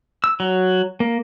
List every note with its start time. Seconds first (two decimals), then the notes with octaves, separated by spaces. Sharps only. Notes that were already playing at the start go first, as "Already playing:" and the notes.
0.24 E6
0.40 F#3
1.00 A#3